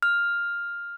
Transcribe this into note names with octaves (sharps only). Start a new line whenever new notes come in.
F6